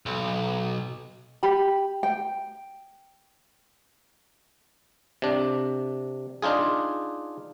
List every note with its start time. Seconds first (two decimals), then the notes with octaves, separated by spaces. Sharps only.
0.06 B1
1.43 G4 B5
2.03 G5
5.22 C3 D4
6.42 D4 D#4 F4 G#4